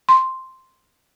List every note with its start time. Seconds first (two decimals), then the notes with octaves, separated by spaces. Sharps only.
0.09 C6